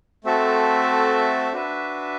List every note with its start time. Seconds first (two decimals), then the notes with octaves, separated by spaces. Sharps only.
0.24 A3 C4 F#4 A4 E5
1.52 D4 F#4 B4 E5